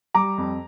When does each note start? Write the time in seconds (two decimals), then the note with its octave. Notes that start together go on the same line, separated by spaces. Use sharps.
0.14 G3 A#5 D6
0.38 F2